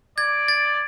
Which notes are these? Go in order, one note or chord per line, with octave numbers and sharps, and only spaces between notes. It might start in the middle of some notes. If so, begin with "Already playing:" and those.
D5 G#6
A6